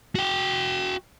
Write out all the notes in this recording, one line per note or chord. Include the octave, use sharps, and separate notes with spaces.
F#4 G5